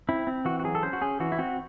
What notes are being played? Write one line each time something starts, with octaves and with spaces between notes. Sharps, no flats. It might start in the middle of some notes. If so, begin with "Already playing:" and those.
C4 E4
C4
E3 F#4
F#4
F#3 G#4
A4
C#4 C5
F#4
C#4 G#4
E3 F#4
E4
C4 F#4